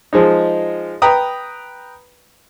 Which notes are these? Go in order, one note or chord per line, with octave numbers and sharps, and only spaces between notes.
F3 G#3 D#4
B4 G5 A#5 D#6